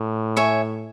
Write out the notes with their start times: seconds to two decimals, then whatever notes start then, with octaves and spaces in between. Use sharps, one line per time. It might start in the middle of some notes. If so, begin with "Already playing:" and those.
Already playing: A2
0.37 C#5 E5 G#5